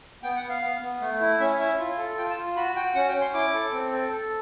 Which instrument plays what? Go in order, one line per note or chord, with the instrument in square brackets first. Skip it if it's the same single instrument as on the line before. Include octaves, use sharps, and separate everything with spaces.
[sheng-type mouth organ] B3 G5
F#5
B3
F5
B3
B3
A3
E4
C#4 E5
E4 E5
F4
A4
F4 G5
A5
F4
F#4 B5
F#4 G5
C#4 F#5
G5
C#4
C6
E4 D6
A4
C4
A4
A4